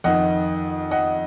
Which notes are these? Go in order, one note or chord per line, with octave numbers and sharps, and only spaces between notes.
F2 D#3 D#5 F#5
D#5 F#5